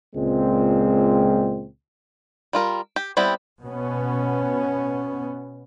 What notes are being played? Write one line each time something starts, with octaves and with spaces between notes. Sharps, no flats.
C#2 A#2 G#3 C4
G3 F4 A#4
G4
G3 B3 C4 E4 G4
B2 B3 C#4